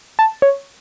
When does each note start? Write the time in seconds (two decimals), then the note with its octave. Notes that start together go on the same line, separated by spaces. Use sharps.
0.19 A5
0.42 C#5